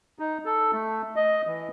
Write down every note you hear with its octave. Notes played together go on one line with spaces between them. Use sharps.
D#4
A4
A3
D#5
E3